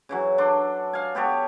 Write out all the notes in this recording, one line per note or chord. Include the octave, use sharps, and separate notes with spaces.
C#3 E3 F#3
D4 A4 C6 D6
F5 G#5
B3 G4 A4 C#5